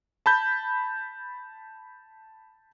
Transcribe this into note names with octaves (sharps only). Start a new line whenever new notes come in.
A5 B5 G6